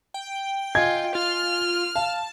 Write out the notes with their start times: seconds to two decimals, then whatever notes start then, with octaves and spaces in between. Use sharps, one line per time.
0.14 G5
0.75 F4 D#5 G#5 G#6
1.15 F4 F6
1.95 F5 A5